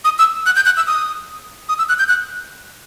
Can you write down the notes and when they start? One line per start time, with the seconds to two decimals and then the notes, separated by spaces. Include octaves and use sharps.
0.05 D#6
0.19 E6
0.46 F#6
0.56 G6
0.66 F#6
0.77 E6
0.87 D#6
1.69 D#6
1.78 E6
1.89 F#6
1.99 G6
2.09 F#6